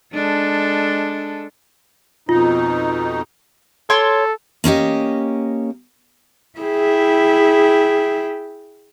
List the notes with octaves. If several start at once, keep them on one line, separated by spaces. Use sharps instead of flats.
G#3 D4 A4
F2 B2 D#4 F4
A4 C#5 C6 D6
A#3 C#4 G4 D#5
E4 G#4 E5 G5